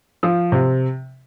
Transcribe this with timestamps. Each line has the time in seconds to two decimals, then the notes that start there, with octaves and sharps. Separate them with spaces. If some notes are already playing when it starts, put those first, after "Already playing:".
0.23 F3
0.52 C3